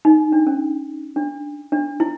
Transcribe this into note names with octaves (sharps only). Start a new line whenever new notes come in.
D#4
D4
C#4
D4
D4
E4